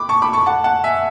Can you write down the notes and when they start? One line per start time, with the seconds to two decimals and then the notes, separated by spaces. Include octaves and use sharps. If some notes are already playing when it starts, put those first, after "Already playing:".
Already playing: B5 D6
0.09 A5 C#6
0.22 B5 D6
0.33 A5 C#6
0.46 F#5 A5
0.64 F#5 A5
0.84 E5 G#5